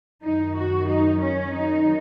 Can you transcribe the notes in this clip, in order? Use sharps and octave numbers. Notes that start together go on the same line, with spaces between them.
F#2 D#3 D#4
F#4
D#4
C#4
F#2 D#3 D#4